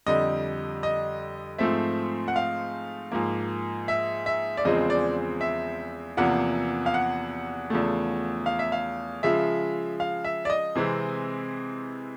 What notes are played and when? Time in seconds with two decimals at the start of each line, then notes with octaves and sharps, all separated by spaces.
0.06 F2 D3 G3 D#5
0.83 D#5
1.58 G#2 F3 A3 C4 E5
2.28 F#5
2.36 F5
3.12 G#2 F3 A#3
3.88 E5
4.26 E5
4.57 D5
4.65 E2 C#3 F3 G#3 C4 D#5
4.90 D5
5.41 E5
6.17 E2 C3 F3 A#3 F#5
6.86 F5
6.94 F#5
7.70 E2 C#3 F3 A3
8.46 F5
8.59 E5
8.72 F5
9.23 C#3 F3 G#3 E5
10.00 F5
10.24 E5
10.45 D5
10.50 D#5
10.75 C3 E3 G#3 C4